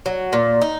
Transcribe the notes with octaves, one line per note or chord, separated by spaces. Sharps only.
F#3
A#2
D#4